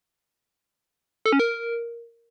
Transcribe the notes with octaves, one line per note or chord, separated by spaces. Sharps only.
A4
C#4
A#4